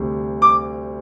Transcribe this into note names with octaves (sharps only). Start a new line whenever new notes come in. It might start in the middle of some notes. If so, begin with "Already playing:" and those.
Already playing: D2 C3 G3
D6